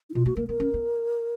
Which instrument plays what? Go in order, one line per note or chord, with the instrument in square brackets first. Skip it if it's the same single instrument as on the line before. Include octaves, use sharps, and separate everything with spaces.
[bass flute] D#4
[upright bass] B2 [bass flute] F4
[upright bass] A#3 [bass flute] F#4
[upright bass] A#3 [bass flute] A#4
[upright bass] B3 [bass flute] A#4
[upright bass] C#4
B3